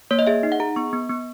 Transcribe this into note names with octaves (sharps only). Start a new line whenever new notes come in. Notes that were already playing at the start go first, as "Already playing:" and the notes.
A#3 C#5
D#5
G#4 E5
D#4
F#5
G#4 A#5
B3 C#6
B3
B3